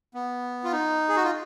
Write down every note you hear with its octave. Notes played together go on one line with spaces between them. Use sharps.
B3
F4
D#4
G#4
F#4
F4